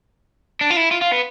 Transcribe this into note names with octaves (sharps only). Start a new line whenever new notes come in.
D4
F4
E4
F4
F4
B3